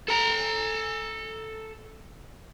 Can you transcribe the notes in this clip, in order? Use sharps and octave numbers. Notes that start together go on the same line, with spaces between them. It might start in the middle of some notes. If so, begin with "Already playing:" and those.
A4 A#5